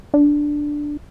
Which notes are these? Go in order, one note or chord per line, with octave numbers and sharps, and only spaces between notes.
D4